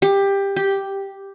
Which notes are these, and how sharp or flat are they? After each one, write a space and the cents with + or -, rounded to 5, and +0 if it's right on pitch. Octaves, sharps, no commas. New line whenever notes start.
G4 +15
G4 +0